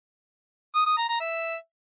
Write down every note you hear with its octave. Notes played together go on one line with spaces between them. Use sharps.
D#6
D#6
A#5
A#5
E5